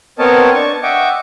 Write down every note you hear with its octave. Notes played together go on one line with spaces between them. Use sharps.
B3 C4 A#4 C#5 D#5 A5
D4 A5 C#6
D#5 E5 F#5 G5 C#6 D6